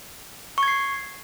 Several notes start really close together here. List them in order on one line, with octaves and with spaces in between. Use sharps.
C#6 G#6 C7